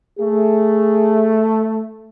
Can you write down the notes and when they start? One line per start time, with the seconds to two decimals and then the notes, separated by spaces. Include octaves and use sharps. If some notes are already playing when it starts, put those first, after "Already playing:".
0.19 A3 G#4